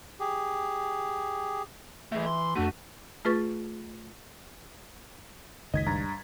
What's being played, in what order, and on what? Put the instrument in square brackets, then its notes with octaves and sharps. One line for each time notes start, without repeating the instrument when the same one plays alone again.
[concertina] G4 G#4
[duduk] E3 [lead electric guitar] A3 G#4 [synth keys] E5
[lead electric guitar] C6
[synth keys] F2 D4 D#7 [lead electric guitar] A3 [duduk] F#4
[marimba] A3 F4 G#4 B4 C#6 A6
[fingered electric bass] F#1 C#2 D#3 [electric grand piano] D#5 G#6 B6
[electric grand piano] G2 A#5 A6